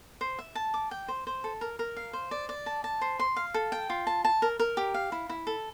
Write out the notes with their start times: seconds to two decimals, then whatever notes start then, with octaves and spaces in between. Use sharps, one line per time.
0.21 C5
0.39 E5
0.55 A5
0.74 D6
0.91 G5
1.08 C5
1.27 C5
1.44 A4
1.61 A#4
1.79 A#4
1.97 F5
2.13 C5
2.31 D5
2.49 D5
2.66 A5
2.84 A5
3.01 C5
3.19 C6
3.36 F5
3.54 A4
3.72 G5
3.90 F4
4.07 A5
4.25 A5
4.42 A#4
4.59 A#4
4.77 G4
4.94 F5
5.12 E4
5.29 E4
5.47 A4